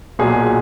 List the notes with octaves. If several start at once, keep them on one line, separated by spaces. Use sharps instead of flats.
B1 A#2 F#3 G#4